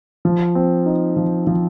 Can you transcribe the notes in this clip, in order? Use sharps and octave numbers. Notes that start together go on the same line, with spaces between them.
F3
C4
D#4
F3
F3